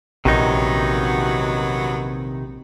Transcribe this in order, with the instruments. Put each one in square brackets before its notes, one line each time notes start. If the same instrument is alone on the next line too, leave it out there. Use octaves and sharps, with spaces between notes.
[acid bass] A#1 [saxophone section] F#2 F#3 B3 [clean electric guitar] C3 D#3 D#4